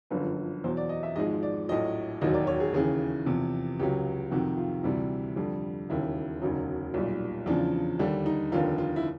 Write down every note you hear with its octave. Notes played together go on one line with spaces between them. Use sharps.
G1 F#2 D3 F3 B4
E2 B2 F#3 C5
D5
D#5
E5
G#1 G#2 F3 G#3 D#5
D5
A#1 A2 F#3 D#5
E1 D#2 D#3 F#3 D#5
D5
C#5
G#4
D#2 C#3 E3 G#4
E2 C3 F3
C#2 C#3 F#3 G4
F2 C3 D#3 F#4
F4
D2 C3 E3 G3
F2 D3 G3
E1 D#2 C#3 E4
E1 D2 C#3 F#3 D#4
B1 A#2 G3
E2 C#3 F3 D4
D#2 D3 G3 D4
D#4
F1 D#2 D3 F4
F4
E4